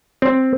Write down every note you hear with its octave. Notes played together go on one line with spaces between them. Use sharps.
C4